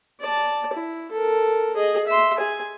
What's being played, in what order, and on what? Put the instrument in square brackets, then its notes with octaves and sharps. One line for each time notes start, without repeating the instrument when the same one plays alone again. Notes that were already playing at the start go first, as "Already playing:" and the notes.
[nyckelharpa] D5 A5
E4
A4 A#4
G#4 D#5
E5 C6
G#4 G#5